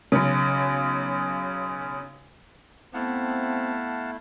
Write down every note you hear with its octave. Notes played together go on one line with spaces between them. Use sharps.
B1 C#3
A3 B3 C4 E4 F5 F#5 A5